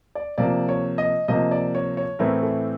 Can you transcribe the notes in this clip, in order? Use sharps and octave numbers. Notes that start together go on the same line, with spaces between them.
D5
C3 F3 A#3 D5
C#5
D#5
C3 F3 A#3 D#5
D5
C#5
C#5
A2 E3 A3 C4 E4 A#4
A4